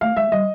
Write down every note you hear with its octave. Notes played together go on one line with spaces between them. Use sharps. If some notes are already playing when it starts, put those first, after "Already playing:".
A3 F5
G#3 E5
G3 D#5